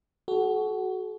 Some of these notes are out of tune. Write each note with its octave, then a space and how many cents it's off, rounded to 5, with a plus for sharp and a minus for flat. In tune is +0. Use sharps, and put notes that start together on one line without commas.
F#4 +15 A4 -45